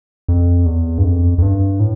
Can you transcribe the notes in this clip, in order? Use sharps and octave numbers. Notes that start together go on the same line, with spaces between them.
F2
E2
G2
F2
F2
G2
A2